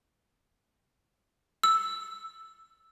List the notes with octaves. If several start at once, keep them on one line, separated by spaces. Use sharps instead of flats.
E6